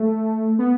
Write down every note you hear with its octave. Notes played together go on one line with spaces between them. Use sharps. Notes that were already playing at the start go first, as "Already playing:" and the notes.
Already playing: A3
B3